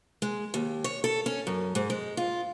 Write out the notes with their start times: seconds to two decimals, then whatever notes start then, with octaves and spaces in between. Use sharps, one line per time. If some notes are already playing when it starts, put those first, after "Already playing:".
0.22 G#3
0.54 D#2
0.84 C#5
1.04 A4
1.26 C#4
1.47 F#2
1.75 G#2
1.90 G#3
2.17 F4